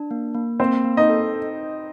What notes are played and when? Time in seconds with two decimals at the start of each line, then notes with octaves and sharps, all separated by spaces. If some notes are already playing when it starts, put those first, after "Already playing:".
Already playing: D4
0.11 A#3
0.34 A#3
0.60 A#3 C4 C5
0.84 A#3
0.97 D#4 D#5
1.10 A4